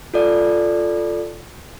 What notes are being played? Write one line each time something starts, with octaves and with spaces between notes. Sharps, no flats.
F4 A4 D5